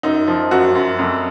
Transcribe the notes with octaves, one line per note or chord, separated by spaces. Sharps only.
F#2 D#4
F3
F#2 F#4
F#2
F2